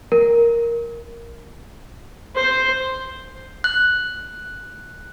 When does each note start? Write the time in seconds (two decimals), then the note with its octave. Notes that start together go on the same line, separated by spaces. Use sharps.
0.12 A#4
2.36 C5
3.64 F#6